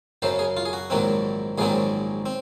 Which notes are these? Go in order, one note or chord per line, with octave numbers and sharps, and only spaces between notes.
F#2 C#3 F#3 C5
G#4
F4
G#4
F#4
A#1 G#2 D#3 F#3 C4
A#1 G#2 D#3 F#3 C4 G#4
C4